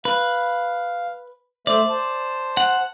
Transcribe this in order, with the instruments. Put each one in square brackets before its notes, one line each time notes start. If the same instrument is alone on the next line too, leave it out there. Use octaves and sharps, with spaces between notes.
[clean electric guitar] B4 [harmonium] F5
[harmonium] A3 C5 E5 [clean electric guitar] D5
[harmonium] C5 A5
[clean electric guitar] F#5